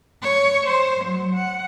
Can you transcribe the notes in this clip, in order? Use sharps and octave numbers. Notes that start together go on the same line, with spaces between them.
C#5
C5
F#3
F#5